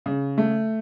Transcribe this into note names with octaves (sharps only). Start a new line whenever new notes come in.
C#3
A3